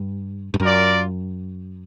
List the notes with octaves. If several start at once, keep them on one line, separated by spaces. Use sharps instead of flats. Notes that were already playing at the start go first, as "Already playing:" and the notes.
Already playing: G2
G2
F#2 F4 A#4 D5